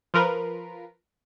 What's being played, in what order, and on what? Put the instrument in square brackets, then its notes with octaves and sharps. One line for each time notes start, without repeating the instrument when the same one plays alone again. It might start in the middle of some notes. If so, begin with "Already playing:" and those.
[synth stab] F3 F4 A#4 B4